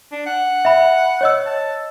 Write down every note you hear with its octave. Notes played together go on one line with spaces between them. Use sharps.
D4
F#5
E5 B5
C#5 D#5 E6
A5